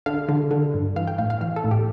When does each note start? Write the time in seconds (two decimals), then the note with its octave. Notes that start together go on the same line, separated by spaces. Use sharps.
0.06 D3 F5
0.29 D3
0.51 D3
0.74 G2
0.96 E3 F5
1.07 G5
1.18 A2 F5
1.30 F5
1.41 E3 F5
1.56 A4
1.64 A2
1.71 G4